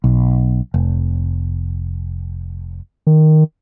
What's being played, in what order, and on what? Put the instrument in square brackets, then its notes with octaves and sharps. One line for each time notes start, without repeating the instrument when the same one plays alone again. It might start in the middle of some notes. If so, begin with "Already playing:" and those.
[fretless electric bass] B1
F1
[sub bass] D#3